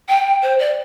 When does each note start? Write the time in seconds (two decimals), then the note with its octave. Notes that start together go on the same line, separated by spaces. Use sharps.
0.09 G5
0.43 C5
0.59 D5